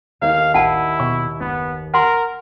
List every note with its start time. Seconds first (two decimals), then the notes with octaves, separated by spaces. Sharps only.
0.22 D#2 F5
0.54 A1 E4 F#5 A5
1.00 B2 C#6
1.40 F#1 B3
1.94 A#4 F#5 C6